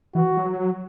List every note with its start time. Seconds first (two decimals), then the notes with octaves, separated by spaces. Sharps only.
0.15 E3 F#4
0.37 F#3